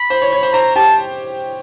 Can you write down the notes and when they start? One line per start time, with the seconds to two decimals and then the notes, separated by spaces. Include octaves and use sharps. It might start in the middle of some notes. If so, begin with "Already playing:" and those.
Already playing: B5
0.10 C5
0.22 C#5
0.32 C#5
0.43 C5
0.54 C5 A#5
0.76 G4 A5